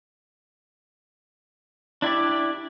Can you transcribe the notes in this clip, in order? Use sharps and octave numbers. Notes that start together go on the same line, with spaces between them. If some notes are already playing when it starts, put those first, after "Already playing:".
D4 E4 G4 D5